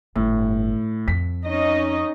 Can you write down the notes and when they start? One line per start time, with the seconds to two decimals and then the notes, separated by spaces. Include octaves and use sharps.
0.16 G1 A2
1.08 F2 B6
1.45 C#4 D#4 D#5